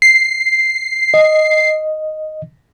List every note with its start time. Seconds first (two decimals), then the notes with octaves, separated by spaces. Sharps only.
0.02 C7
1.14 D#5